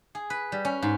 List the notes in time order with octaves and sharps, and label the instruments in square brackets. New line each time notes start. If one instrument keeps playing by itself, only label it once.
[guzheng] G#4
B4
G3
C#4
G#2